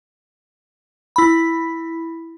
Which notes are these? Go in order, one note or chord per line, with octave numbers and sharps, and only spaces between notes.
E4 B5